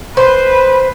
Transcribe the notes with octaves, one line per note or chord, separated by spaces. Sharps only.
B4 C5